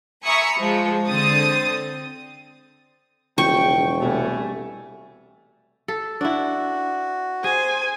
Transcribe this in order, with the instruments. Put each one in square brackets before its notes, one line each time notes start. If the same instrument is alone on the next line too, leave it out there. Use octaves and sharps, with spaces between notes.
[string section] E5 G#5 A#5 B5 C#6 D#6
F3 G#3
D3 C4 D#6 A6
[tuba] E1 [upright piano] C#3 F3 F#3 [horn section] G5 [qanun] C#6
[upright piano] C2 B2 [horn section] G3 A3 G#5
[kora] A4
[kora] D4 E4 [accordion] F#4
[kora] G#4 [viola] C5 G#5